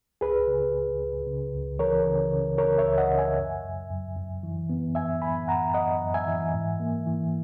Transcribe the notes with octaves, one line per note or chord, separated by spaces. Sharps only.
C#2 G#4 B4
C#3
C#2
C#2
C#3
C#2
E3 A#4 C#5
C#3
C#3
C#3 A#4 C#5
C#5 E5
C#2
D#5 F#5
C#3
E5 G#5
F#2
F#2
F#2
F#2
E3
B3
F#2 E5 G#5
B3 G#5 B5
F#2 F#5 A#5
F#2 D#5 F#5
F#2
E5 G#5
E3
G#2
A#3
E3